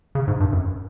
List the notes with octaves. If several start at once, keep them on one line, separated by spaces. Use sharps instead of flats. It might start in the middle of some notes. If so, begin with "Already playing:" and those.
C#3
G#2
G2
F#2